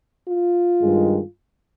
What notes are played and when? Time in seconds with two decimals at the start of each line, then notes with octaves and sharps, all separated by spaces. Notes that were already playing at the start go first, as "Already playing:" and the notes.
0.26 F4
0.81 G2 D#3 G#3